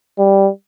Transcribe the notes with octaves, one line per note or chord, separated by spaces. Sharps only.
G3